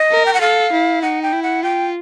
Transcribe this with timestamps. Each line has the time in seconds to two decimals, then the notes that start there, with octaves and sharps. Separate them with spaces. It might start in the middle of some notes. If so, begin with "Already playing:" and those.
Already playing: D#5
0.11 A#4
0.26 G5
0.34 F#5
0.41 A4 F5
0.72 E4
1.02 D#4 F#5
1.22 G5
1.32 E4
1.43 F#5
1.63 F4 G5